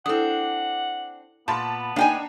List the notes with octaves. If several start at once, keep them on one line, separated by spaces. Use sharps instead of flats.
C4 D4 E4 A4 F#5 D#6
A#2 B3 A5 B5 C6
A#3 D4 D#4 G5 G#5